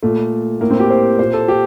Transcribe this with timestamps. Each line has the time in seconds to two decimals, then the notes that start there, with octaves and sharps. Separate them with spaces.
0.03 A#2 A3
0.60 A2 A#3
0.71 C4
0.80 G4
0.90 C5
1.18 A#2 C5
1.33 A4
1.48 G4